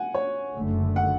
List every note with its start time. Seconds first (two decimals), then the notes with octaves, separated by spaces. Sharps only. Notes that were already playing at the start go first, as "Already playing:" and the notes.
Already playing: F#5 G#5
0.15 C#5
0.55 F#1 F#2 D3 A3
0.96 F#5